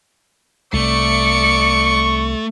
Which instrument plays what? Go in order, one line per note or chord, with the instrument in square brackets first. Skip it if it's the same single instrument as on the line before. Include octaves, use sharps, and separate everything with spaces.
[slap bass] C2 [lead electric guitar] A3 [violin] D5 C#7 [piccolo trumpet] C#6